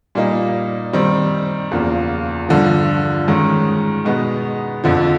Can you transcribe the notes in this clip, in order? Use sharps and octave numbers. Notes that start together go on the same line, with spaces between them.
A#2 G3 A#3 D#4
D#3 G3 C4
E2 C#3 F3 A#3
G2 D3 F3
G#2 D#3 G#3 C#4
B2 G#3 B3 D#4
F2 D3 F3